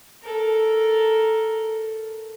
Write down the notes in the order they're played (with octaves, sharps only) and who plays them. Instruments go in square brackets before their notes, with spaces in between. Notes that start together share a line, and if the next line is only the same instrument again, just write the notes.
[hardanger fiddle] A4 A#4